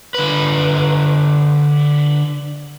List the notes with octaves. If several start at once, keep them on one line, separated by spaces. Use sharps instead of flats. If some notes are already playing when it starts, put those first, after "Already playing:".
D3 B4